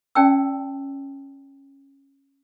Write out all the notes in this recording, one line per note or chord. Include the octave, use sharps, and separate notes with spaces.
C#4 D5 G5 A5 E6